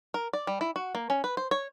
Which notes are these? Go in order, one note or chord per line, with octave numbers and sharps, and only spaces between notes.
A#4
D5
G3
E4
F#4
A#3
C#4
B4
C5
C#5